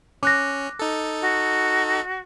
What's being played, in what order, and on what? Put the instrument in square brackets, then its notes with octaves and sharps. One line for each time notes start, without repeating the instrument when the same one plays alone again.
[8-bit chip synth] C#4 [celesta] D6 F#6 A#6
[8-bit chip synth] D#4 A4
[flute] F#4